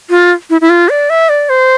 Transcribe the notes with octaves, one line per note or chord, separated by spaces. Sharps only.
F4
E4
E4
F4
D5
E5
D5
C5